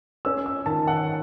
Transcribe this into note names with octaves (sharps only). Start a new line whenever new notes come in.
C#4 E6
E6
D#3 A5
F#5